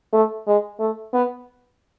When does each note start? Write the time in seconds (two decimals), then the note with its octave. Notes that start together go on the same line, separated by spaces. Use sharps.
0.13 A3
0.47 G#3
0.80 A3
1.14 B3